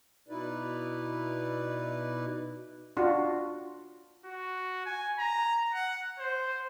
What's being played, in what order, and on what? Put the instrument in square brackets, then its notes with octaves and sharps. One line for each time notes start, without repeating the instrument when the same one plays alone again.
[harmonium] B2 D#4 E4 B4 D5
[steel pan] D4 F4 F#4
[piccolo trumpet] F#4
G#5
A#5
F#5
C5